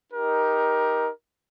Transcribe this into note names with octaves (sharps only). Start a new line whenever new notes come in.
D#4 G4 A#4